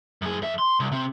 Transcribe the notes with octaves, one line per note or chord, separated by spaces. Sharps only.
F#2 G#4
F2 E5
C6
C2
C3 C4